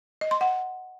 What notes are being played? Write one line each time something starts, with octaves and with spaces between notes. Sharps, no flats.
D#5
C6
F#5